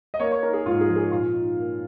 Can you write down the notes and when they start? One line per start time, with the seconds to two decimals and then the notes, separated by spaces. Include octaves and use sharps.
0.14 D#5
0.20 A#3 C#5
0.31 C#5
0.42 D#4 A#4
0.53 G#4
0.66 G#2 F4
0.81 G#4
0.88 F3
0.96 G#4
1.11 A#2 F4
1.34 D#4
1.57 A#3